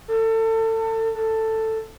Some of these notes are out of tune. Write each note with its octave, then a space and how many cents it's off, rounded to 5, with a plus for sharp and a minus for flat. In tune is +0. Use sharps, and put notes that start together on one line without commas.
A4 +30
A4 +10